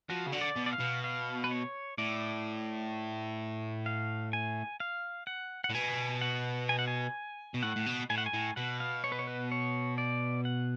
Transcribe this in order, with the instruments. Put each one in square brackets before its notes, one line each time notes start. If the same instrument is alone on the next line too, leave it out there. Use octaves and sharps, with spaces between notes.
[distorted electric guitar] F3 [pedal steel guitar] F#4
[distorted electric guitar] C#3
D3
[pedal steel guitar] D5
[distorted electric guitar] B2
[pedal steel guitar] D5
F5
[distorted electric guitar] B2
[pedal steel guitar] F5
B4
C#5
[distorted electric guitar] A2 [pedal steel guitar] D5
[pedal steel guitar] F5
G#5
F5
F#5
F#5
[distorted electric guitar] A2
[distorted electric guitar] B2 [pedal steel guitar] G#5
[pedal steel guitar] F#5
G#5
F#5
G#5
[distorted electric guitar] B2
[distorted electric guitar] A2 [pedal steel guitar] F#5
[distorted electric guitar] A2
B2
[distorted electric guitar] A2 [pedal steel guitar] G#5
[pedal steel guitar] F#5
G#5
[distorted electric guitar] A2
[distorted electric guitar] B2 [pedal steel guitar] F#5
[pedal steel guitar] F5
C#5
B4
C#5
B4
C#5
D5
F#5